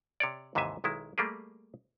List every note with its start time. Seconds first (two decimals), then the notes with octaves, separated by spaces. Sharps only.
0.20 C3 C#5 D5
0.55 D#2 G#2 C3 E3 E5 G#5
0.84 B1 D#3 G#3 E4
1.18 G3 A3 A#3 G4 G#4